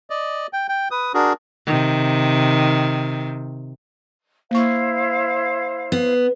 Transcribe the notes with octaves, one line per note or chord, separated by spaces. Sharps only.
D5 D#5
G5
G5
B4 D#6
D4 F#4 G#4 A#4
C3 D#3
A#3 E4 C5 F5 C#6
B3